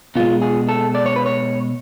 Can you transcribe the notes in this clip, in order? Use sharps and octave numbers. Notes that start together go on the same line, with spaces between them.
B2 G#3 F4
G#4
A4
D5
C#5
B4
C#5